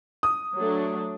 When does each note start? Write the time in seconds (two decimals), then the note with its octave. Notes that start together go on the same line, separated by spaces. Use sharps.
0.23 D#6
0.55 F#3 A3 D4